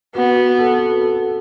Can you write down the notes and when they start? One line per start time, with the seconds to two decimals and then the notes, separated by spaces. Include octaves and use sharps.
0.15 B3 F#4
0.36 F#4
0.58 A4
0.79 F#4
1.01 A4